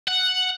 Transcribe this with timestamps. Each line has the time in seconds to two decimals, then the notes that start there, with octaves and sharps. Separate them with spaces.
0.08 F#5